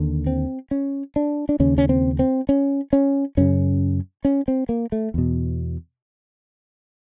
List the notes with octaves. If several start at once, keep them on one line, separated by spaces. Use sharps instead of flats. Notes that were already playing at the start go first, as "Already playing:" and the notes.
Already playing: D#2 D3
C4
C#4
D4
D4
D#2 C#3 C#4
C#4
C4
C4
C#4
C#4
F#2 C#3 C#4
C#4
C4
A#3
A3
E2 B2